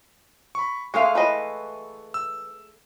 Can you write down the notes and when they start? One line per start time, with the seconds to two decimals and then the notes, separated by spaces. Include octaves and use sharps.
0.55 B5 C#6
0.94 G#3 A3 G#4 F5 C#6
1.15 E3 B4 D#5
2.14 E6